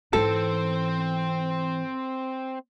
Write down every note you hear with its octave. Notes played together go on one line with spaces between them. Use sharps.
G#2 E3 C4 A4 C5